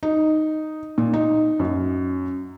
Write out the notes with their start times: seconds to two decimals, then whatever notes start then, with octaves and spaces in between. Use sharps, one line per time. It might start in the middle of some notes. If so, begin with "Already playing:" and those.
0.03 D#4
0.98 A#2
1.13 D#4
1.60 F#2